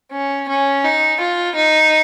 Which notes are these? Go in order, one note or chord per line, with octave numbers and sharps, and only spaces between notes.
C#4
C#4
D#4
F4
D#4